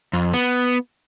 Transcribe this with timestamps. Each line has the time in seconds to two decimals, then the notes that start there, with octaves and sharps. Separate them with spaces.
0.13 F2
0.34 B3